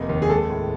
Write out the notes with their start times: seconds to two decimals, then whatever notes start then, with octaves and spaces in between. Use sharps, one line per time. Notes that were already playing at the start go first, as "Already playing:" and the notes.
Already playing: F1 A#3 D#5
0.09 D#2
0.22 G#4
0.29 G#3 A4
0.50 A2